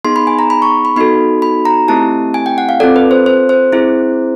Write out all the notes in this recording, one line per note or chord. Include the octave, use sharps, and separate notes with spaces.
B3 D#4 G#4 C6
B5
G#5
A#5
B5
C#6
B5
B3 D#4 F#4 A4 B5
B5
A#5
A3 C4 E4 G4 A5
G#5
G5
F#5
F5
C4 F4 A4 D5
B4
C5
C5
C5
C4 E4 G#4